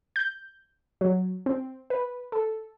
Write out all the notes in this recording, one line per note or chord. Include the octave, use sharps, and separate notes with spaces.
G6
F#3
C4
B4
A4